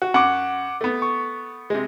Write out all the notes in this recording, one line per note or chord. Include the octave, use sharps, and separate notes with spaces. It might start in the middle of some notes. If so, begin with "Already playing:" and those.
F#4
F#2 F#5 C#6 D6
A3 B3
C#6
C3 G#3